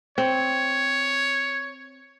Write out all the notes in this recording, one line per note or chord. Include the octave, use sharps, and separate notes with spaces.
C4 C#5